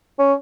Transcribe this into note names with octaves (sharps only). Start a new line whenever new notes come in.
C#4